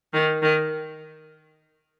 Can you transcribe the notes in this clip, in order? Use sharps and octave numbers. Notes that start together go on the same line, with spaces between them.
D#3
D#3